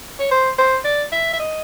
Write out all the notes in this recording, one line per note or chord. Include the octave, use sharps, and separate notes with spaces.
C#5
C5
C5
D5
E5
E5
D#5